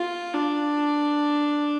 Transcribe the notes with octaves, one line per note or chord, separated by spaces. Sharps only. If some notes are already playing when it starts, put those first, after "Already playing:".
Already playing: F4
D4